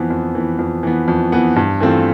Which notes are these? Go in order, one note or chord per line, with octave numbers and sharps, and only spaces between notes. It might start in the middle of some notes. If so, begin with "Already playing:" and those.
Already playing: F2 E3 B3
F2
E3 B3
F2
E3 B3
F2
E3 B3
G2
E3 A3 C4 F4